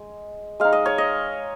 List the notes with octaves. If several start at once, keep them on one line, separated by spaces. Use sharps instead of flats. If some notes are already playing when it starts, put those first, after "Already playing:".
Already playing: G#3
G#3 D#4 F5
D#5
C#5
D#5